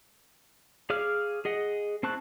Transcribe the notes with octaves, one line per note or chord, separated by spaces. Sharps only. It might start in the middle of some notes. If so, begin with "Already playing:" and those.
G#4 C#5 F5 D6 F6
G#4 D#5 F#5
C4 E4 A5 C#6 F#6